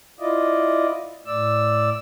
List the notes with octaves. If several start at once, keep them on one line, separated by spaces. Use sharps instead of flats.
E4 F4 D5 D#5
A2 D5 E6